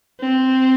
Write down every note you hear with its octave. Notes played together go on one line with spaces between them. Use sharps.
C4